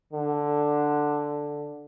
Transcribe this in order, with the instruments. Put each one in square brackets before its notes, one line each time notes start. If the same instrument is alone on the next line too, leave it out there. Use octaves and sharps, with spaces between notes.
[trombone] D3